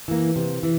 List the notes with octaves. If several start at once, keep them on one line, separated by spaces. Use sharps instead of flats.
E3 A#3
C3
E3